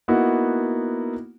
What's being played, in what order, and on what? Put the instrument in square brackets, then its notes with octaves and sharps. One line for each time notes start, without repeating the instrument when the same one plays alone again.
[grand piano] A#3 B3 D#4 E4 F#4